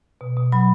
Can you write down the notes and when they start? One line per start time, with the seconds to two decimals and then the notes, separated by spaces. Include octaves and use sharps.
0.21 B2
0.37 B2
0.52 F#3 B5